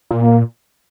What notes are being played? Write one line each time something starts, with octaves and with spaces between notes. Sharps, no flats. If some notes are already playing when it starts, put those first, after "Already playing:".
A#2
A#3